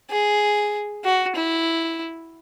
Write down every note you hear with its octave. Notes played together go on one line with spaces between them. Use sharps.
G#4
F#4
E4